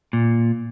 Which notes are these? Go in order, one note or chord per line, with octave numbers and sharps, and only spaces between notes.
A#2